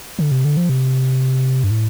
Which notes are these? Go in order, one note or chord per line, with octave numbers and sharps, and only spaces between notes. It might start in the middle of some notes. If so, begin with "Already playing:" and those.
D3
C3
D3
F3
C3
G2
A2